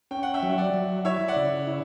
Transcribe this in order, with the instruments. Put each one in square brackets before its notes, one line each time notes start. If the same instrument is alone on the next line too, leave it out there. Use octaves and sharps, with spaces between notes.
[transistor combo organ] C#4 [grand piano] G5
[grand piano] F#5
E5 G5
[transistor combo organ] F#3
[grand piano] E5
D5 F#5
[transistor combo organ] F#3
[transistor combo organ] E4 [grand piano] C#5 E5
[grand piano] D5 F#5
[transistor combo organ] C#3
E4